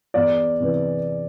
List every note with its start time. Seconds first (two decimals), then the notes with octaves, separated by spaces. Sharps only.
0.14 E2 D5
0.60 C3 E3